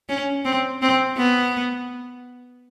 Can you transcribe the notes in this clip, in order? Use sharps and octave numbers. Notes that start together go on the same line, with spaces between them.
C#4
C4
C4
B3